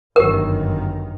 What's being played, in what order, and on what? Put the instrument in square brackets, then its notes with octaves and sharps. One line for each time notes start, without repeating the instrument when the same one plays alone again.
[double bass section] G1 F#2 D#3 [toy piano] G4 A#4